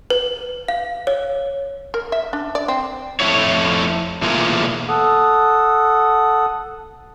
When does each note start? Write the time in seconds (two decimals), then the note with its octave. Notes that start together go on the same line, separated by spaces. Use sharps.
0.10 B4
0.68 F5
1.07 C#5
1.94 A#4
2.12 E5
2.33 D4
2.55 D5
2.68 C4
3.20 F2 A3 E4 C#5
4.22 B2 E3 A3 A#3 F4 G#4
4.89 A4 F#5 D#6